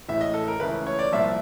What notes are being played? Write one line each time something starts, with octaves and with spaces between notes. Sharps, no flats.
A1 A2 E3 G#3 E5
D#5
A4
A#4
C#2 C#3 E3 A3 B4
C#5
D5
C2 A#2 F3 E5